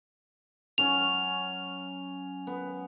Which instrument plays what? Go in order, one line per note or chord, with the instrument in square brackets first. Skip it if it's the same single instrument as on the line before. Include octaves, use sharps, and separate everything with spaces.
[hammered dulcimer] F#3 C#4 [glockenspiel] F7
[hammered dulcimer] B3